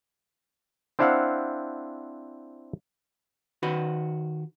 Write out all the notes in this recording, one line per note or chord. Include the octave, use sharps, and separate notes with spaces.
C4 D4 E4 C5 F5 F#5
D#3 F#4 B4